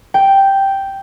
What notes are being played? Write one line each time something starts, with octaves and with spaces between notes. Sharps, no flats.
G5